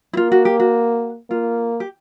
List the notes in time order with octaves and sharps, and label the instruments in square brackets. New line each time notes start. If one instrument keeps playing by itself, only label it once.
[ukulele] E4
[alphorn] A#3 [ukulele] F4
[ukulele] F#4
G4
F#4
[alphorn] A#3 [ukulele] F4
[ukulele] G4